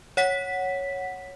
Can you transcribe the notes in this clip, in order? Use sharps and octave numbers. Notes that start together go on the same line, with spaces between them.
C#5 F#5 B6